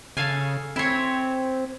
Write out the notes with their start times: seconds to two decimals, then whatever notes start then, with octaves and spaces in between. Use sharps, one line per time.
0.17 C#3 A4 F5 G#5
0.76 C4 E4 C#5